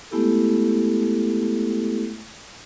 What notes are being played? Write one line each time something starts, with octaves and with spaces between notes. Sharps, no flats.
G#3 A3 B3 E4 G4 A4